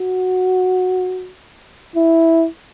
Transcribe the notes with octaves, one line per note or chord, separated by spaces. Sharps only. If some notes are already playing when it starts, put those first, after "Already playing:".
Already playing: F#4
E4